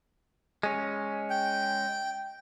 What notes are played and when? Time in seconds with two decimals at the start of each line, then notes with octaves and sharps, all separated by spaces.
0.63 G#3 C#4
1.30 G5